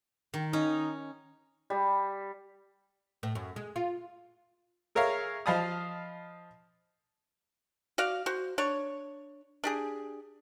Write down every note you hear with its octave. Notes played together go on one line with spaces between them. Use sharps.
D#3
C#4 D#4
G3
A2
F#2
G#3
F4
G#4 A#4 C#5 E5 F5
F3 D#5 F5 A5 B5 D#6
F#4 D5 F5
F#4 C5
D4 C#5
D4 G4 G#4